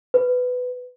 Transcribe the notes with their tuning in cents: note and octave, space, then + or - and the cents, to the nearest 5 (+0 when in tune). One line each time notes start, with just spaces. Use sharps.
B4 +15